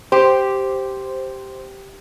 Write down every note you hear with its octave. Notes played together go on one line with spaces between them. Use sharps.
G4 C5